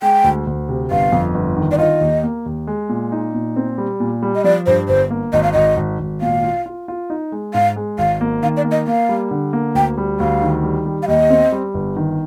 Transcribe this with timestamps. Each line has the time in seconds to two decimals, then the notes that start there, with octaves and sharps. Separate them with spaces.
0.02 G#3 G5
0.24 D2
0.47 D2
0.69 C3
0.91 G1 F5
1.13 F2
1.35 G1
1.57 D#3
1.72 D5
1.78 F4 D#5
2.01 D#2
2.23 A#3
2.46 D#2
2.67 G#3
2.89 A#2
3.12 D#4
3.34 A#2
3.56 C4
3.78 G3
4.00 A#2
4.22 G3
4.35 D#5
4.44 F3 D5
4.66 G2 C5
4.88 G1 C5
5.11 A#3
5.33 G#1 D#5
5.43 F5
5.53 G#1 D#5
5.77 G#1
5.99 G#1
6.21 A#2 F5
6.44 F4
6.66 F4
6.88 F4
7.10 D#4
7.32 G#3
7.54 G#2 F5
7.76 G#3
7.98 G#1 F5
8.21 A#3
8.43 D#3 F5
8.57 D5
8.64 A#3
8.71 D#5
8.87 A#3 F5
9.09 G3
9.31 D3
9.53 A#3
9.75 D2 G5
9.98 G3
10.20 D2 F5
10.42 D#3
10.63 G3
10.86 G3
11.03 F5
11.08 D#2 D#5
11.30 C4
11.52 G3
11.74 G1
11.96 D#3